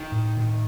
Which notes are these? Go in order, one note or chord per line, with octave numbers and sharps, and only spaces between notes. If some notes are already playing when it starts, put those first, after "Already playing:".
Already playing: D#3
A2
A2